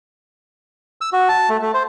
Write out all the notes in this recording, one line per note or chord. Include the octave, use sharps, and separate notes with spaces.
E6
F#4
A5
A3
A3
C5